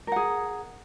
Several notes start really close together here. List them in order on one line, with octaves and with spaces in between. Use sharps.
A#4 F#5 G#4